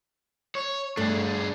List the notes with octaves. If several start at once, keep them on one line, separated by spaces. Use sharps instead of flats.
C#5
G2 A3 D4 G#4